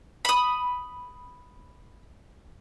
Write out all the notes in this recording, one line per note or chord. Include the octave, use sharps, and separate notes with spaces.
B5 D#6